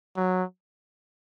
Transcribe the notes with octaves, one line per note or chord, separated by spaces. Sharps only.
F#3